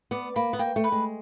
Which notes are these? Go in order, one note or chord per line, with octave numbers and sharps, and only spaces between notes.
B3 D5
A#3 B5
B3
A#3 G5
A3
B4
G#3